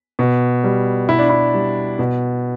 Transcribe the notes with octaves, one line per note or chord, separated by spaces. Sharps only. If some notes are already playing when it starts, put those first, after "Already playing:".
B2
G3
B2 E4
D4
E4
G3
B2